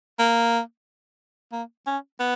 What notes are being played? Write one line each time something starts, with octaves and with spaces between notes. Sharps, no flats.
A#3
A#3
C#4
B3